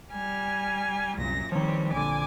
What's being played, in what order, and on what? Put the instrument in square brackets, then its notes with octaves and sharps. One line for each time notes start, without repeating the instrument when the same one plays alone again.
[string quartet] G3 G#5 F6
[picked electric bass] C2 [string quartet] F#2 A#2 A#6
[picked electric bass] D#3 F3 [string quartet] G3 C4 C#5
[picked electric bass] A#1 D3 [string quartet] G#5 D6